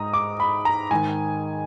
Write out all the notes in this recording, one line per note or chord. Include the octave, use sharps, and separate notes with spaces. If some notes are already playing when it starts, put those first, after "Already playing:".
Already playing: G#2 A#5 D#6
D6
B5
A#5
G#2 D#3 G#5